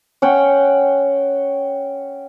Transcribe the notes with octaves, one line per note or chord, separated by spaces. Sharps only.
C#4 F#5 G5 C#6